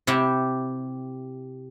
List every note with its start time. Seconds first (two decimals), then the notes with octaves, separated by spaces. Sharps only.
0.07 C3 E4 G4